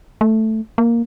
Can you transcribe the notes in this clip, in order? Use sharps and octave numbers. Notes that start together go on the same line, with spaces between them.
A3
A#3